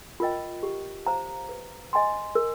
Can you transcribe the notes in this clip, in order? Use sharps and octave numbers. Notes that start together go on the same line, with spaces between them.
F4 A#4 D#5 G5
G4
C5 F5 A#5
B4
D#5 G#5 C6
A#4